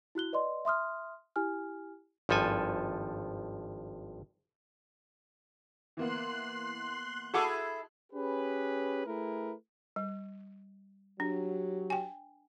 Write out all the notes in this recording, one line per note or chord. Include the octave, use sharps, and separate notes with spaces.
E4 F#4 F#6 G7
B4 D5 D#5 C6
E5 C6 D#6 F6
E4 G4 G#5 F6
G#1 G2 F3 A4 G#5
E3 A#3 B3 C6 F#6
E4 F#4 G#4 A4 F#5 D6
C#4 G4 G#4 B4
A3 E4 G#4 A#4 B4
G3
F#3 D4 G4
G5 G#5